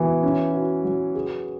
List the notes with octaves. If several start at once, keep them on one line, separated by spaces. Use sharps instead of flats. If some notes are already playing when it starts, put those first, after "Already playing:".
Already playing: E3 B3 F#4
C#4
F#4
F#3
G#4